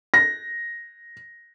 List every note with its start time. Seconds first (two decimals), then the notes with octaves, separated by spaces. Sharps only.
0.14 A#6